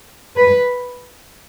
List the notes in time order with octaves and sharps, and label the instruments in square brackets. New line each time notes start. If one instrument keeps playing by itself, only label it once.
[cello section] B4